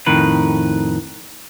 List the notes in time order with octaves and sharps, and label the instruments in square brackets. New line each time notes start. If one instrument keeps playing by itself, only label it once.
[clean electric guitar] F2 A2 D#3 B4